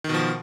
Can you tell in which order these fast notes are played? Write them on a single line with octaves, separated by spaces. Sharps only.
D#3 B2 F3